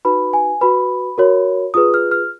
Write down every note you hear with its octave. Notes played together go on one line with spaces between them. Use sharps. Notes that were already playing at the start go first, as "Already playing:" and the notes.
D#4 F#4 B4 B5
G#5
F#4 B4 B5
F#4 A#4 C#5
F4 G#4 B4 D#6
F6
F6